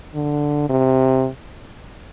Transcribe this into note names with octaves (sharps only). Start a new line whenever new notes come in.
D3
C3